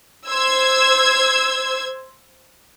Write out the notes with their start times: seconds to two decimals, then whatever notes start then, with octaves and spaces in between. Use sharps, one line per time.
0.29 C5 E6 G#6